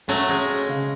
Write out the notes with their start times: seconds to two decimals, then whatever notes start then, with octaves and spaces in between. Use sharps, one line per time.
0.09 F#3 A3 C#4
0.29 G#3 C#4
0.49 C#4
0.69 C#3